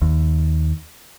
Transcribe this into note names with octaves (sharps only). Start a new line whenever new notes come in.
D#2